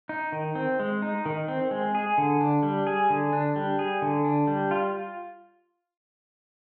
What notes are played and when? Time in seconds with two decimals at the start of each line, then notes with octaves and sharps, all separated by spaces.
0.09 D#4
0.32 D#3
0.55 C4
0.80 G#3
1.02 D#4
1.26 D#3
1.48 C4
1.71 G#3
1.95 G#4
2.18 D3
2.41 D4
2.63 G3
2.87 G#4
3.10 D3
3.33 D4
3.56 G3
3.79 G#4
4.02 D3
4.25 D4
4.48 G3
4.71 F4